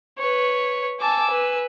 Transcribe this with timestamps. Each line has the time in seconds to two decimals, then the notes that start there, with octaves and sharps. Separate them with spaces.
0.18 B4 C#5
1.00 G#5 A5 D6 E6
1.32 B4